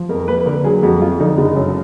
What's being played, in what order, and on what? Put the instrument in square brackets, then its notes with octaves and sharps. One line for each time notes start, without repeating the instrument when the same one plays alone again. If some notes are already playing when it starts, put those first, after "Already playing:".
Already playing: [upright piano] F3
F2 A#4
A#4
A#3 B4
B4
D3 A#4
F#3 G#4
F2 F#4
F2 F4
D3 D#4
F#1
F#2